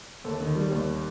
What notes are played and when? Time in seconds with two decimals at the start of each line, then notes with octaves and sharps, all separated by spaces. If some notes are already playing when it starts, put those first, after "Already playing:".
0.24 D#2 A4
0.40 D#3
0.55 G3
0.72 D#2